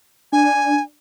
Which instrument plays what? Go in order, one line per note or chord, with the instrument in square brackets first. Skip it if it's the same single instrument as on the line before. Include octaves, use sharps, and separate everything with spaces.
[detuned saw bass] D4 [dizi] G#5